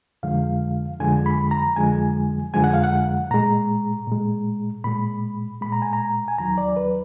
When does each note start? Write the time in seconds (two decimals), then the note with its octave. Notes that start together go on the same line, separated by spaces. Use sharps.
0.23 F2 D3 F3 G#3 F5
1.00 F2 D3 F3 G#3 G#5
1.26 B5
1.51 A#5
1.76 F2 D3 F3 G#3 G#5
2.54 F2 D3 F3 G#3 G#5
2.64 F#5
2.74 F5
2.84 F#5
3.31 A#2 G#3 A#5
4.07 A#2 G#3
4.84 A#2 G#3 B5
5.61 A#2 G#3 B5
5.72 A#5
5.82 G#5
5.93 A#5
6.28 G#5
6.38 D#2 D#3 F#3 A#5
6.58 D5
6.77 B4